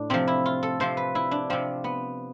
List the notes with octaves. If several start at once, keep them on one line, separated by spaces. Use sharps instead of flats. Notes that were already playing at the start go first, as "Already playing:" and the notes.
Already playing: A2 D4
C3 F3 C4
E4
F4
A4
C3 F3 C5
B4
E4
D4
C3 F3 C4
B3